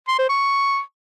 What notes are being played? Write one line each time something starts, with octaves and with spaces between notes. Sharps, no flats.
C6
C5
C#6